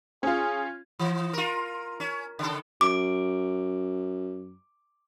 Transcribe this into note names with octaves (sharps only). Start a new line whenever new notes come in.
C#4 F4 G#4
E3
F4 A#4
C#4
C#3 A4
F#2 D6